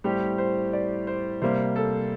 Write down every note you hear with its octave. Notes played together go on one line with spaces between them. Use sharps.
A2 G3 C4 G4
C5
D5
C5
C3 G3 A#3 C5
A4